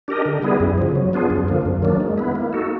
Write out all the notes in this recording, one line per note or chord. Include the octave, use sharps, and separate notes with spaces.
D4 G4 A#4 D#5
D3
G3 B3 E4 G#4
F#2
C#3 F3
F#3
B3 D4 F4 G#4
F#2
D3 F3 A#3
F#2
D#3 F#3 A#3 D4
G#3
B3 E4
A#3
D#4 F#4 A4